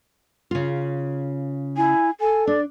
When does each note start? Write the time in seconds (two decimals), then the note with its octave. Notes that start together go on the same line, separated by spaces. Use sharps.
0.51 C#3 F4
1.77 E4 G#5
2.20 A4 G#5
2.47 D4 D5